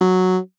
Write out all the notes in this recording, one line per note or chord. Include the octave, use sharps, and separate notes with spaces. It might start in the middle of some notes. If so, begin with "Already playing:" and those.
F#3